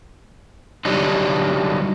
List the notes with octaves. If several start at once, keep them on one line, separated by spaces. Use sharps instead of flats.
D3 F#3 G3 D4 D#4